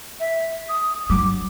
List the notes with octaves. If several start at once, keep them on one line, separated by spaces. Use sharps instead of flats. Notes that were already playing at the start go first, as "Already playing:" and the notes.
E5
D#6
G2 F#3 D6